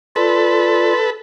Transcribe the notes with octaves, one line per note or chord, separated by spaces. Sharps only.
F4 A4 B4 D5